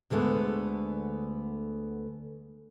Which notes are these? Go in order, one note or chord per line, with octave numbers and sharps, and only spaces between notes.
D2 D3 G#3 A3 B3